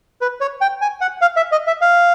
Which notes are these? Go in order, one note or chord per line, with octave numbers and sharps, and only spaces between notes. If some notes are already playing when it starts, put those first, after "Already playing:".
B4
C#5
G5
G#5
F#5
F5
E5
D#5
E5
F5